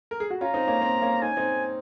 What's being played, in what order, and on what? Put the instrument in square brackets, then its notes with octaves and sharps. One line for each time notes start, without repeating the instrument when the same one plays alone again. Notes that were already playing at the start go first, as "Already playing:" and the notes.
[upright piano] A#4
G#4
F#4
[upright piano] C#4 F4 [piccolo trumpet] A#5
[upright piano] C4 D#4
A#3 C#4
C4
A#3 C#4
[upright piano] D#4 [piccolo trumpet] G#5
[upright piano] C#4
C4 D#4